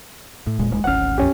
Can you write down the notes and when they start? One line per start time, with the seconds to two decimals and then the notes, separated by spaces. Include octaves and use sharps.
0.47 A2
0.59 E1 A#2 G#3
0.71 D#1 G#3
0.84 D1 G#1 C#4 F#5 F6
1.18 A#1 F2 C#4 G4